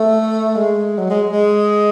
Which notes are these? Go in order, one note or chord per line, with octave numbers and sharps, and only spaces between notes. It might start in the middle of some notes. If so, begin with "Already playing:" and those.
Already playing: A3
G#3
F#3
G#3
G#3